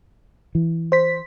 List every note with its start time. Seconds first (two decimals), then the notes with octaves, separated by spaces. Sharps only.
0.55 E3
0.92 C5 B6